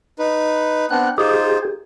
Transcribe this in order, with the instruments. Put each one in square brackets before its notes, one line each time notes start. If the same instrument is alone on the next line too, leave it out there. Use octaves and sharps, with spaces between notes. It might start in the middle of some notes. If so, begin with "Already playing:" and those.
[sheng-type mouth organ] D#4 B4
[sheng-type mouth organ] B3 C4 D4 [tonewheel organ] F#6
[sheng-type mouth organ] D#4 F4 C5 [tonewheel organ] G4 G#4